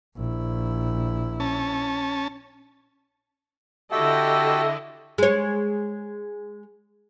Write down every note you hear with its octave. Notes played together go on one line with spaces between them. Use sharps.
A#1 E4
C#4 A5
D3 E4 F#4 G4 A4 D#5 E5 G5
G#3 C#5